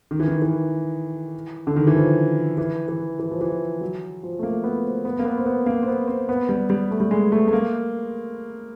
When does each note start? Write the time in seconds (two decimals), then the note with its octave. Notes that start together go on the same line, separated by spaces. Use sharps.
0.11 D#3
0.20 E3
0.28 D#3
0.42 E3
1.67 D3
1.76 D#3
1.87 E3
1.96 F3
2.58 E3
2.88 E3
3.19 E3
3.31 F3
3.41 E3
3.81 F#3
4.23 F3
4.39 A3
4.43 A#3
4.64 B3
4.84 C4
5.05 B3
5.19 A#3
5.25 B3
5.38 C4
5.46 B3
5.66 A#3
5.83 C4
5.88 B3
6.07 C4
6.29 B3
6.49 G3
6.70 G3
6.91 A3
7.00 G3
7.11 G#3
7.32 A3
7.48 A3
7.53 A#3